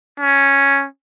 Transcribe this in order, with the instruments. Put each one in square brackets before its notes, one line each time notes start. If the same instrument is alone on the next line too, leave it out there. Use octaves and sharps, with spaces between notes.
[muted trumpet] C#4